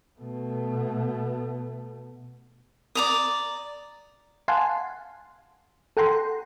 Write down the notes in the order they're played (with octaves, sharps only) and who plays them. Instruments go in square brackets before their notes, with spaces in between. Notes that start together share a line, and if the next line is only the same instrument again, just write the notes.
[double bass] B2 A3
[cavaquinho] D5 A#5 D#6
[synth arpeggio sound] F5 F#5 G#5 A5 C6
A4 F#5 G5 A#5 C6